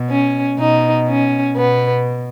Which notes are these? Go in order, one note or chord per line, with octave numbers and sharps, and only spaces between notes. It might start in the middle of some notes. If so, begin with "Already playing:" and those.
Already playing: B2
C#4
B2 D#4
C#4
B2 B3